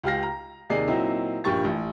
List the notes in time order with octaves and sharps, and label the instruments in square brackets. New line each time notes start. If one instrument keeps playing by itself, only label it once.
[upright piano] C#2 G4 F5 A#6
A#5
D#2 C3 D#4 G#4 D5 C7
A#2 F#3 C4 D#4 E4
A#1 G2 A#2 G4 C#6 A6
A1